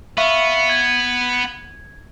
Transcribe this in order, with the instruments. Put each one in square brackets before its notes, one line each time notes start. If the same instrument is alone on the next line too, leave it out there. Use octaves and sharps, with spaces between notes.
[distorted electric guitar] B3 [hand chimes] E5 F5 C#6
[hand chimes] G#6